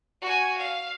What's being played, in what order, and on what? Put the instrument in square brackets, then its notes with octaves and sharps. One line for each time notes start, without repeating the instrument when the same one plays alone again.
[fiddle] F#4 G#5
F5